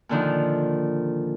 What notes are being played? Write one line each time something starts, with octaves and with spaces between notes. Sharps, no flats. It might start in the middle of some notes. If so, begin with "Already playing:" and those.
A#2 D3 D#3 F3